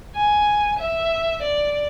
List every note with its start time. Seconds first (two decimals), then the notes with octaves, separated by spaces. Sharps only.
0.15 G#5
0.79 E5
1.42 D5